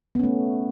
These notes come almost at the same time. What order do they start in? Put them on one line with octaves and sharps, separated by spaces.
B3 C#4 A3